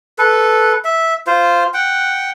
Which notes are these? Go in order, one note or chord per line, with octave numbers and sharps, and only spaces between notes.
A4 B4
E5
F4 C5
F#5 G5